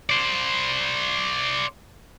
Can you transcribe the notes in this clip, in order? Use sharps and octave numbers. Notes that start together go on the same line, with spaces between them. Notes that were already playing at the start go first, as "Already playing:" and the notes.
C5 D5